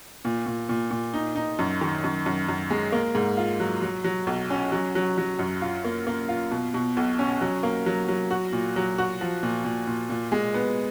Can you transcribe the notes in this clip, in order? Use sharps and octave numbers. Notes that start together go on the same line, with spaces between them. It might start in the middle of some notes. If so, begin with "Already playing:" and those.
A#2
A#2
A#2
A#2
D#4
D#4
F#2
D#3
F#2
F#2
F#2
G#3
A#3
G#2
F4
F#3
F#3
F#3
B1
C#4
F#3
F#3
F#3
F#2
F4
A#3
A#3
F4
B2
B2
B1
C#4
F#3
A#3
F#3
F#3
F#4
A#2
F#3
F#4
F3
A#2
A#2
A#2
A#2
G#3
B3